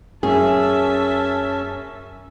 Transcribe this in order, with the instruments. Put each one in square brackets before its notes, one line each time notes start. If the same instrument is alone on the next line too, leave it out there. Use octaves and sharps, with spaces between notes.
[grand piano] F#2 [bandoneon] C#4 [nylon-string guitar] G#4 [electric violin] E5 A5